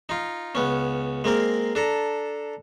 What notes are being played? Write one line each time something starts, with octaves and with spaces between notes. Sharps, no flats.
D#4 F4
C#2 B3 C#4
G#3 A#3 C4 A#4
D4 A4 A#5